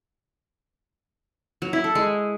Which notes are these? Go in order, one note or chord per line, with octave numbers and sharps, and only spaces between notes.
F#3
E4
A4
G#3